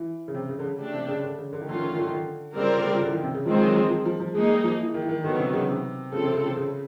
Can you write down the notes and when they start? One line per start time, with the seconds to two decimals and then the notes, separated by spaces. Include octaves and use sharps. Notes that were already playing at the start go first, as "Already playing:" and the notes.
Already playing: E3
0.28 C#3
0.34 C3
0.49 C#3
0.59 D3
0.64 C#3
0.79 A3 D4 G4
0.94 C3
1.08 C#3
1.24 D3
1.38 C#3
1.53 D3
1.61 D#3
1.68 D3 A3 C#4 F4
1.76 D#3
1.84 D3
1.91 D#3
1.99 D3
2.07 D#3
2.14 D3
2.56 C#3 G3 C4 F4 A#4 D5
2.77 D3
2.86 C#3
3.01 D3
3.07 E3
3.13 D#3
3.23 C3
3.35 C#3
3.46 D#3 F3 G#3 C4 F4 G#4
3.60 F#3
3.75 F3
3.90 F3
4.05 F3
4.20 F3
4.34 G#3 A#3 D#4 G#4
4.50 G3
4.64 F3
4.79 E3
4.94 D#3
5.02 E3
5.09 D#3
5.24 D3 D#3 F#3 B3
5.39 C3
5.53 C#3
5.68 C3
6.12 C#3 A3 C4 F4 A4
6.24 C3
6.35 C#3
6.46 C3
6.57 C#3